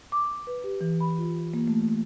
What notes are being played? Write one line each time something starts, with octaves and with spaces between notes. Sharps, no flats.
D6
B4
G4
E3
B5
F4
A#3
A3
A3